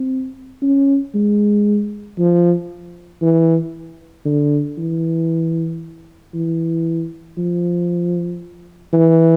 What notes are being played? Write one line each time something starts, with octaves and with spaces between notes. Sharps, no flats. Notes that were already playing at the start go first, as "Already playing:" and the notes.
Already playing: C4
C#4
G#3
F3
E3
D3
E3
E3
F3
E3